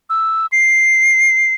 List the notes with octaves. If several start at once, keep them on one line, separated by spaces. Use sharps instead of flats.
E6
C7